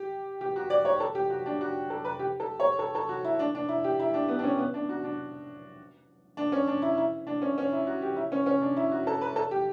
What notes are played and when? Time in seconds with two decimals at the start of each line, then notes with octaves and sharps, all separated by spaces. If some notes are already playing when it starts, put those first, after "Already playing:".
Already playing: G4
0.41 G4
0.56 F#4
0.70 D5
0.85 C#5
1.00 A4
1.15 G4
1.30 F#4
1.46 D4
1.61 F#4
1.90 A4
2.05 B4
2.19 G4
2.40 A4
2.60 C#5
2.79 A4
2.95 A4
3.09 F#4
3.24 E4
3.39 D4
3.55 D4
3.69 E4
3.84 G4
4.00 E4
4.14 D4
4.28 B3
4.39 D4
4.44 C#4
4.58 B3
4.74 D4
4.89 F#4
5.04 D4
6.37 D4
6.52 C#4
6.67 D4
6.82 E4
6.97 E4
7.27 D4
7.42 C#4
7.58 C#4
7.73 E4
7.87 F#4
8.02 G4
8.16 E4
8.32 C#4
8.46 C#4
8.62 D4
8.77 E4
8.91 F#4
9.07 A4
9.21 B4
9.36 A4
9.51 G4